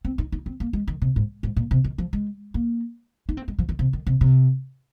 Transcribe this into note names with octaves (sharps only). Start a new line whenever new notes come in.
C4
D#4
D#4
C4
A#3
G#3
D#3
C3
G#2
G#2
A#2
C3
D#3
F3
G#3
A#3
D#4
C4
G#3
F3
D#3
C3
D#3
C3
C3